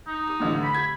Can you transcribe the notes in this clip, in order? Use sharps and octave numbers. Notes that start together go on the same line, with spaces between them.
D#4
D#6
A2 D3 E3
B5
G#6